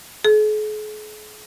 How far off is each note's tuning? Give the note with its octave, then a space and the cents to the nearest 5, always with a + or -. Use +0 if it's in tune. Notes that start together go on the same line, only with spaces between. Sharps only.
G#4 +45